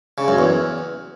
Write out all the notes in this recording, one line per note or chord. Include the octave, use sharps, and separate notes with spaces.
C#3
F#2
E2